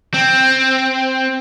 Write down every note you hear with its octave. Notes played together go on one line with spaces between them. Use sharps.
C4